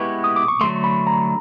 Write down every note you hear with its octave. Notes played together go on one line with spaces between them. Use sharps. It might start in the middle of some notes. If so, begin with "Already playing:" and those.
Already playing: G#3 B3 E4 G4 B4 C#6
D#6
D6
C#6
D3 F#3 A3 C6
B5
A#5